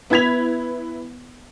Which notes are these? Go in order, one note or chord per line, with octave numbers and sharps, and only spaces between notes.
B3 E4 B4 G#6 B6 F7